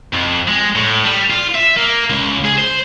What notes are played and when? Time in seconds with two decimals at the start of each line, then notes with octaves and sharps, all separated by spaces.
0.13 F2
0.48 G#3
0.76 A2
1.05 G3
1.30 F4
1.54 E5
1.76 A#3
2.10 C#2
2.45 G#4
2.57 C5